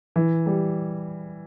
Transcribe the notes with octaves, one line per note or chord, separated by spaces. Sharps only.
E3
G3